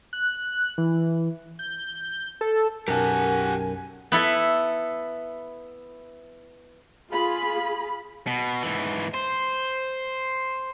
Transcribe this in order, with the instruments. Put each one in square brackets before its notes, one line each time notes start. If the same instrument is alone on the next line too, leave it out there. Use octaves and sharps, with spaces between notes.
[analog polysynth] F#6
E3
G6
A4
[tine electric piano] B1 F#2 [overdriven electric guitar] G4 F#5 [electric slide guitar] A#4 A5 [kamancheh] G#5
[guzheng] B3 E4 A4 E5
[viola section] F4 G#4 B5
[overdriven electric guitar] B2
G#2 E3
C5